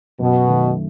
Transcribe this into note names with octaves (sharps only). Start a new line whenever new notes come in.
F#2 B2
D#3 A3